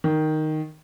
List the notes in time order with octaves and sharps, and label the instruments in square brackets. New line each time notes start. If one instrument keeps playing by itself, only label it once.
[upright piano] D#3